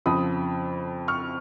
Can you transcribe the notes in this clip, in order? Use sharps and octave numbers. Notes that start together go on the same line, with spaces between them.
F2 C#3 F3 B5 D#6
C#6 F6